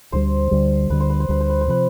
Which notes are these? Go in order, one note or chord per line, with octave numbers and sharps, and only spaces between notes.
D2 D3 G3 C5
D2 D3 G3
D2 D3 G3 B4
C5
B4
C5
D2 D3 G3 B4
C5
B4
C5
C3 F3 B4